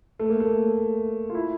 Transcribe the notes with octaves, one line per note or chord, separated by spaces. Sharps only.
A3
A#3
A3
F4
E4